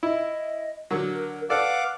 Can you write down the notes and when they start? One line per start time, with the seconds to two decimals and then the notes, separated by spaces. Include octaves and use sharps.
0.03 E4 D#5
0.91 D3 F#3 A#4
1.50 A4 B4 D5 F5 F#5 D6